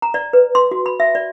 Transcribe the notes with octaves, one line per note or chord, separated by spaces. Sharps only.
A#5
D5
B4
C6
F#4
B5
E5
D5